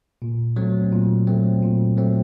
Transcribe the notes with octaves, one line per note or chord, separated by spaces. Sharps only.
A#2
F#3 A3 C4
A#2
F#3 A3 C4
A#2
F#3 A3 C4